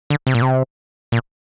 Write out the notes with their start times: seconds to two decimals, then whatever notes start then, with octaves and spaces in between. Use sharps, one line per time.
0.10 D3
0.27 C3
0.35 A#2
0.42 C3
1.12 A#2